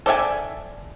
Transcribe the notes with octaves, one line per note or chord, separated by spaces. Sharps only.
A4 D5 E5 G5 G#5